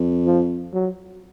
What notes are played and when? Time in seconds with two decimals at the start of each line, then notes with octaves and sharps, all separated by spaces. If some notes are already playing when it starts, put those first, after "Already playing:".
Already playing: F2
0.26 F3
0.73 F#3